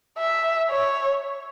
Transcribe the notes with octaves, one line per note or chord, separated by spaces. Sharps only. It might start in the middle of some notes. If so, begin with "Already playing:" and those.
E5
C#5